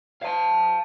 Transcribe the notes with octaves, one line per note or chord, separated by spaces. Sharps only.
F5 A5